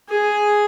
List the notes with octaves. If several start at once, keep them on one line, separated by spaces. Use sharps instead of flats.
G#4